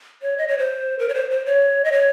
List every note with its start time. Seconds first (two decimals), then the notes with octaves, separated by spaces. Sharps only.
0.22 C#5
0.38 D#5
0.48 C#5
0.58 C5
0.99 A#4
1.09 C#5
1.14 C5
1.30 C5
1.46 C#5
1.84 D#5
1.92 C#5